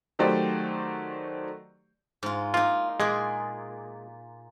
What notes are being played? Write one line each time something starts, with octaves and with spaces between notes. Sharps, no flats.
D#3 F#3 A3 G4 C5 D5
G#2 F4
A#3 D#4 F4
A#2 G#3 G#4 D5